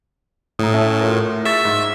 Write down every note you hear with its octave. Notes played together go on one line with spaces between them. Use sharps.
A2 A#5 D#6
C#4 E5 A5
F4 F#4 A#4
G#4 E5 C#6 A6
G#2